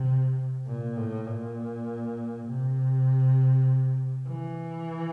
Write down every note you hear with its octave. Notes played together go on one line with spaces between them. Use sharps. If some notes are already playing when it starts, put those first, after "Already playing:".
Already playing: C3
A#2
A2
A#2
C3
E3